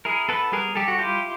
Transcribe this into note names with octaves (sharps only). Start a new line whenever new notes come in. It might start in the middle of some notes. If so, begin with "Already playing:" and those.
E4 G#4 A#4
B3 A4 B4
G3 G#4 A#4
G3 G4 A4
F#4
E4 F4 G4